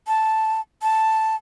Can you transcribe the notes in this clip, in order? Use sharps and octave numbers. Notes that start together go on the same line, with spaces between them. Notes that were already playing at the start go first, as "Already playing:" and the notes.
A5
A5